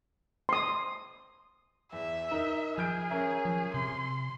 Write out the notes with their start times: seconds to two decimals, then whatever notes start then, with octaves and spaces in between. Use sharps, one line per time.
0.49 C6 D#6
1.93 E2 E5
2.31 D#4 A#4
2.78 F3 G#4 F6 G6 D7
3.10 C#4 A#4 E5
3.45 F3
3.74 C3 C6